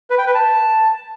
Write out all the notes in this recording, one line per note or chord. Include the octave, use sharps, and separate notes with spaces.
B4
G5
B4
A5